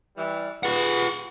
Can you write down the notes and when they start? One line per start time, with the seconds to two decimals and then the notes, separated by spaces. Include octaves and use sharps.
0.17 E3 G3
0.63 F4 G#4 B4 F#5